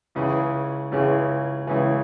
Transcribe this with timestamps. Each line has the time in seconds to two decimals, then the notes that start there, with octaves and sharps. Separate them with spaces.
0.15 C#2 C#3 E3 G#3
0.92 C#2 C#3 E3 G#3
1.67 C#2 C#3 E3 G#3